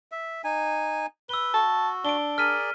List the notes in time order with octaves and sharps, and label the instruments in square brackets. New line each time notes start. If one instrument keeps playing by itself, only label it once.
[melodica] E5
D#4 G#5
[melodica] B4 [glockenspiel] E6 G7
[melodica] F#4 [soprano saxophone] A5
[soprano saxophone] D4 [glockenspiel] D7 G7
[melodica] G#4 A#4 D5 [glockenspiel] F6 B6 D#7